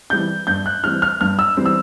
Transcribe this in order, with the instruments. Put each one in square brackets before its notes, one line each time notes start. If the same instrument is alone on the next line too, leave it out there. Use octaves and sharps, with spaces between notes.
[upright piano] E3 G3 C4 G6
G2 G6
F#6
E3 G3 C4 F6
F6
G2 F6
E6
E3 G3 C4
E6